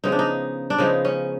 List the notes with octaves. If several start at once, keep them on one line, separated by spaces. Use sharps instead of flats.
C#3 F3 G#3 B3 D#4
D4
D#4
D4
C#3 F3 G#3 B3 D#4
C#4